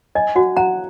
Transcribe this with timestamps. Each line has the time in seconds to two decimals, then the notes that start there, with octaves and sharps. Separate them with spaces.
0.15 D#5 G#5
0.35 F#4 F#5
0.57 F#5 A#5